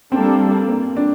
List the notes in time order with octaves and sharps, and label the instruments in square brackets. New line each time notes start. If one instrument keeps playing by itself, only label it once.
[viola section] G3 A#3 D4 A4 [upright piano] C4
[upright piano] A#3
D4